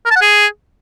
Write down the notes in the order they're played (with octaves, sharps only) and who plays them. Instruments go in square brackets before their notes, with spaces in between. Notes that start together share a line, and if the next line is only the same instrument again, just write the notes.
[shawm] A#4
A5
F#5
G#4